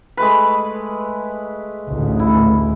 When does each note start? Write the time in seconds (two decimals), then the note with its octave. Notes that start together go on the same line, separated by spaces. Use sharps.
0.17 G#3 A3 B4
1.89 A1 D2
2.19 E4